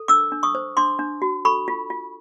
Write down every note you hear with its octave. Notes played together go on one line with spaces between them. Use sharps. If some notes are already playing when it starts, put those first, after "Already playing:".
Already playing: A4
D4 D6 E6
D4
C#6 D#6
C5
D4 C6 D6
D4
F#4
A4 B5 C#6
F4
F4